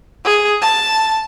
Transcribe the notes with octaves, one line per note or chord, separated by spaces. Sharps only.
G#4
A5